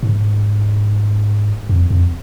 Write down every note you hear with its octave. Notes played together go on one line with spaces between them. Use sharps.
G#2
F2
F2